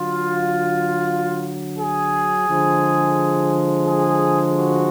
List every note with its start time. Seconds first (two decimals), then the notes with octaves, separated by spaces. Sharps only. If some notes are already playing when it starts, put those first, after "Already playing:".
Already playing: D3 F#3 F4
1.78 G#4
2.47 D3 F3 G#3
3.86 G#4
4.56 F#4